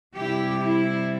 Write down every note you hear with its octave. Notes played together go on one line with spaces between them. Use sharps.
C3 G3 E4 G4
E4